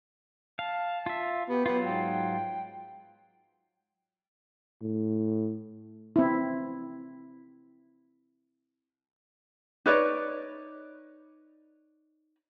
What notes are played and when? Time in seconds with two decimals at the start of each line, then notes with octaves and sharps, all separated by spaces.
0.59 F5 A5
1.06 F4 E5
1.49 B3 G4
1.66 F#3 B3 F4
1.84 G#2 G5
4.81 A2
6.16 C4 E4
9.86 D#4 B4 C#5 D5